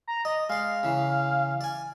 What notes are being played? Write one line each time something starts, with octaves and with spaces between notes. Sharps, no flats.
A#5
D5 D#5
G#3 D5 F5
C#3 E3
D5 G#5